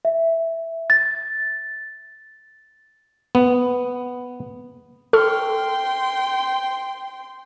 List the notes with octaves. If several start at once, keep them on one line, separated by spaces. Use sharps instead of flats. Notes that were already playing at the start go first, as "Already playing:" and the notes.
E5
A6
B3
A4 G5 C6 C#6 F6